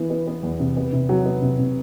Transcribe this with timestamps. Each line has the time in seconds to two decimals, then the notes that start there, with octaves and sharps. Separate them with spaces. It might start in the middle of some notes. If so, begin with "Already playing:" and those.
Already playing: E3 B3
0.10 B3
0.27 B3
0.43 E2
0.60 C3
0.76 B3
0.93 C3
1.09 F#3
1.25 B3
1.42 C3
1.59 C3